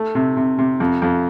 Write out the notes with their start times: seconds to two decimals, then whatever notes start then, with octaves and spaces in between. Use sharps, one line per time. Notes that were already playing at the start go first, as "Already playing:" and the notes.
Already playing: A3
0.15 C3
0.37 C3
0.59 C3
0.80 F2
1.02 F2